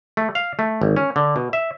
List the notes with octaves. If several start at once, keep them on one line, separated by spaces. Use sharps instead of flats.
A3
F5
A3
G#1
C#4
D3
B2
E5